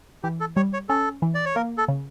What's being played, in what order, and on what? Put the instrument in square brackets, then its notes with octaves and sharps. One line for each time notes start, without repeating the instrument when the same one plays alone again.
[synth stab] E3 [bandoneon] G4
[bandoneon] A4
[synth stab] G3 [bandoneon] C#5
[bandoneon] C#5
[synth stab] C#4 [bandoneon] A4
[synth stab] E3
[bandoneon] D5
C#5
[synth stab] A#3 [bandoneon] A#4
[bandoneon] A4
[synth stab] C#3